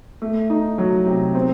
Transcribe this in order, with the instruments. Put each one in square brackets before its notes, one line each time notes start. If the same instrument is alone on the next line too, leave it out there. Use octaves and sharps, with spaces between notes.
[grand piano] A3
D#4
F#3
C3
C4